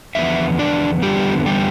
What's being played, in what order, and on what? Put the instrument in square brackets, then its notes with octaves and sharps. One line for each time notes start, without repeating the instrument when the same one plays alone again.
[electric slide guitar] E2 D3 F3 B3 E5
D4 D5
E2 D3 F3 G3 B3 G4
G3 G4